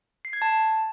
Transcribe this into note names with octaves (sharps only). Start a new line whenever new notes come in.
C7
G#6
A5